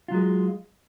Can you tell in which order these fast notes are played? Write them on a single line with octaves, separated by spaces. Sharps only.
F4 F#3 G#3